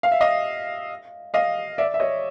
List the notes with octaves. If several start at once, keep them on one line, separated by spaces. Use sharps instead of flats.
F5
E5
D#5 F5
D#5 F5
D5 E5
E5
C#5 D#5